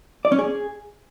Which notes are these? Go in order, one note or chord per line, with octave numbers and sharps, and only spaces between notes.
D5
C#4
G#4